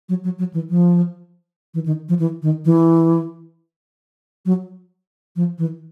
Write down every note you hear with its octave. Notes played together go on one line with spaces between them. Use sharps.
F#3
F#3
F#3
E3
F3
E3
D#3
F3
E3
D#3
E3
F#3
F3
E3